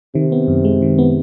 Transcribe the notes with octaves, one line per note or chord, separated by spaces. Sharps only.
C3 D#3
B3
F#2
G#3
D#3
B3